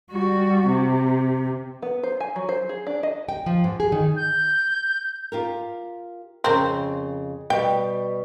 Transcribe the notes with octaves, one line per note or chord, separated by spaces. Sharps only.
G3 F#4
C3
B3
C5
G#5
F#3
C5
G#4
D4
D#5
G5
F3
G#2
G#4
D#3
G6
F4 G4 A#4
F2 C#3 C4 A#4
B2 G3 G5